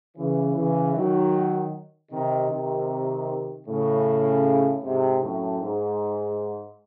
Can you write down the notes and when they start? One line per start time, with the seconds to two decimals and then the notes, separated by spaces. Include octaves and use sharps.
0.17 C#3 E3
0.56 C#3 E3
0.95 D#3 F#3
2.11 C3 D#3
2.50 C3 D#3
3.67 A2 C#3
4.84 G#2 C3
5.22 F#2 A2
5.61 G#2